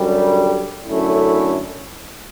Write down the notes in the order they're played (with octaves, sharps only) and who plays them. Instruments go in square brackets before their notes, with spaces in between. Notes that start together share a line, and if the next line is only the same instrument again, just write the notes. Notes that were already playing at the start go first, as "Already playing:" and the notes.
Already playing: [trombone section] F#2 D3 G3
F#2 D3 A3 C#4 E4